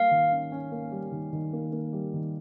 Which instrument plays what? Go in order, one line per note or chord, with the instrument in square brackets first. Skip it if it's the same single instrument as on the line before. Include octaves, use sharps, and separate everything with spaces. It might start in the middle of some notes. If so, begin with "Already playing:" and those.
Already playing: [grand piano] G3 A#3 [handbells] F5
[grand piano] D#3
C#4
C#4
A#3
G3
D#3
D#3
A#3
A#3
G3
D#3